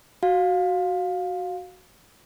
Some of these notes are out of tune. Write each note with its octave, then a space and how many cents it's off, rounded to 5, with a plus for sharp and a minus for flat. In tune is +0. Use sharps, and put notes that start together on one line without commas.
F#4 +0 F5 +15